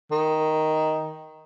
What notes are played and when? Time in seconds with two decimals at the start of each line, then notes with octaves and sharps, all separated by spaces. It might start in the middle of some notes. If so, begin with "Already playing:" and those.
0.12 D#3